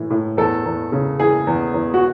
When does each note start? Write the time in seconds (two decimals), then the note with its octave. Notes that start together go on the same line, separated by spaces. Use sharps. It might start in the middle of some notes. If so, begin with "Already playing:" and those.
Already playing: A2 E3
0.10 A2
0.37 E2 A4
0.66 E2
0.92 C#3
1.20 E3 G#4
1.47 E2
1.74 E2
1.94 F#4